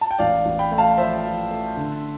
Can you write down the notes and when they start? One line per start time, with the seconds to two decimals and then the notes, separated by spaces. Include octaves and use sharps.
0.01 A5
0.11 G5
0.19 A1 D5 F5
0.45 A1
0.59 G5 B5
0.72 A3
0.78 F5 A5
0.98 F3 C5 E5
1.24 F3
1.51 A3
1.77 D3